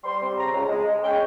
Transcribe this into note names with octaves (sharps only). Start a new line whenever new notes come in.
G3 C6
C4
C#3 A#5
C#2
G#3
G#3
C#4 G5